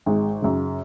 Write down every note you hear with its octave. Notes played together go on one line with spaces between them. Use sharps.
G#1 G#3
F#2 C#3